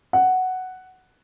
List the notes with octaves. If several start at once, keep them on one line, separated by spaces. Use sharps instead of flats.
F#5